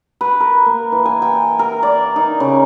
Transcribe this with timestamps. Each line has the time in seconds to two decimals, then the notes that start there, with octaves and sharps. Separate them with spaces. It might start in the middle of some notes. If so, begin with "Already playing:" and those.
0.21 B4
0.40 A#4
0.66 A#3
0.92 E3
1.05 G#5
1.22 G5
1.59 A#4
1.83 D5
2.16 D#4
2.40 C#3